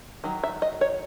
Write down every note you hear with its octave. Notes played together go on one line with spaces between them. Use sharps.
D#3 F#3
E5
D#5
C#5